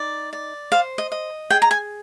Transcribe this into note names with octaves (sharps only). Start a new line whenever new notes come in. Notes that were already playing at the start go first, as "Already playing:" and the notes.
Already playing: D#4 D5
D5
C5 F5
D#5
D#5
G#4 G5
A#5
G#5